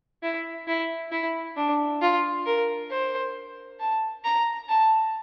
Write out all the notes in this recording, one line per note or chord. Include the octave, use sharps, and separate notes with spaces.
E4
E4
E4
D4
F4
A#4
C5
A5
A#5
A5